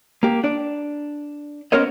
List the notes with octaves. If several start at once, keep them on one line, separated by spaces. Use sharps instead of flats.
A#3 G4
D4 D5
B3 C#4 A#4 C5 C#5 D#5